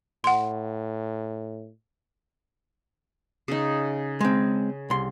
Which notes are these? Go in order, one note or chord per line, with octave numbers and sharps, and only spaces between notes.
A2 F#5 C6
C#3 D#4
G#3 C4
C2 C6